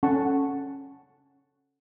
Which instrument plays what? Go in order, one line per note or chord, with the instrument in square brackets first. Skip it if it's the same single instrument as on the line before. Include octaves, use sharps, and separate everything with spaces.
[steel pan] C#4 A4 F#5 A5 C#6